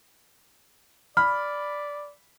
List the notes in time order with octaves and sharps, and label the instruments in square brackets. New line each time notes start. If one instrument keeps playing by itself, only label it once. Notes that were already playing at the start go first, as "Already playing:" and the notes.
[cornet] D5 [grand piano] B5 [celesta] F6